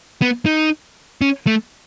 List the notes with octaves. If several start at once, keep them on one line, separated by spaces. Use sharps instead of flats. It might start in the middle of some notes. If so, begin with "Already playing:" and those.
B3
D#4
C#4
A3